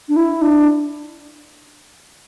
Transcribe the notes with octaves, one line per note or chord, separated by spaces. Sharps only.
D4
E4
D4